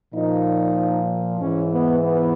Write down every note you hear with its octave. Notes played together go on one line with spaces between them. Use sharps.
A#2 F3 D#4
G#2 E3 C#4
B3
B3